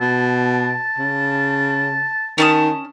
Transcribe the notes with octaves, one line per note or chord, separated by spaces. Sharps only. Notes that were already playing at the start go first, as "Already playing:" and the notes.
B2 A5
C#3
D#3 C#4 A5 D#6